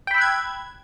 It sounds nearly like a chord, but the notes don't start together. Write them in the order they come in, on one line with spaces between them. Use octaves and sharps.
G5 B5 E6 F#6 G#6